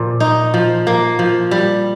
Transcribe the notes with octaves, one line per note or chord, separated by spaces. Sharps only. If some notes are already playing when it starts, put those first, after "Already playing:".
Already playing: A#2 F3
D#4
F3
A#3
F3
G3